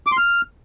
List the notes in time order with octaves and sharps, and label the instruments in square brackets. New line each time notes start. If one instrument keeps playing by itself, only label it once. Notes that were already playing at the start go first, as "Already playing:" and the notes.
[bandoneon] D6
C6
F6